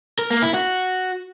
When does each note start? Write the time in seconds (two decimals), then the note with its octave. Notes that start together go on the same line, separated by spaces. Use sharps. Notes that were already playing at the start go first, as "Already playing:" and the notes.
0.19 A#4
0.30 A#3
0.42 E4
0.54 F#4